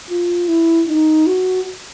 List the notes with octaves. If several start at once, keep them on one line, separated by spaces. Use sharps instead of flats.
F4
E4
D#4
F#4